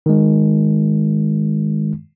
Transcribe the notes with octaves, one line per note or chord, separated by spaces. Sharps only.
D#3 G#3